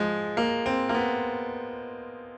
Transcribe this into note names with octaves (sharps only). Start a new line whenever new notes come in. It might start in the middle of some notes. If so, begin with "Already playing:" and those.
Already playing: F3 G#3
A#3
C4
A#3
B3